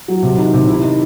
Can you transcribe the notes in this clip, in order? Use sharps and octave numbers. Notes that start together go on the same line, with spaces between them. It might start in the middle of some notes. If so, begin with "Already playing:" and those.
F#3
C3
D#3
C3
E4
D#3